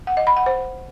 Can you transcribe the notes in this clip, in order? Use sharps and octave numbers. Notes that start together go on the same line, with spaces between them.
F#5
D#5
B5
F#5
C5